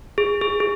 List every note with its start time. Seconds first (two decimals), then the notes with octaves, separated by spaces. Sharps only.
0.18 G#4
0.41 G#4
0.60 G#4